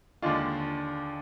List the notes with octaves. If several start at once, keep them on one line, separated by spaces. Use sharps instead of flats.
D#2 D3 G#3 D4 F4